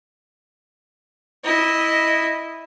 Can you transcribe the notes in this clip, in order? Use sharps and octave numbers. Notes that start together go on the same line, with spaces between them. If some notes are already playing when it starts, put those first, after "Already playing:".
E4 D#5